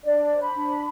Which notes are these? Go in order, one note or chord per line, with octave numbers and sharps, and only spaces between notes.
D4 D5
C5
B5
D4